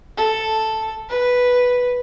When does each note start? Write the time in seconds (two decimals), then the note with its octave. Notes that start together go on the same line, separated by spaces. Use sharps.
0.17 A4
1.09 B4